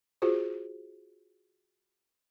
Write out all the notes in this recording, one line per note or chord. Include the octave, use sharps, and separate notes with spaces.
F4 F#4 G#4 C5